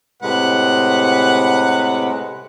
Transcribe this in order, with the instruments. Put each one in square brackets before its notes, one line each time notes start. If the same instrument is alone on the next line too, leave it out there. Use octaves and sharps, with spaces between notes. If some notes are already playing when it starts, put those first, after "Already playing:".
[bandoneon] A2 C3 G#3 [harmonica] B4 F#5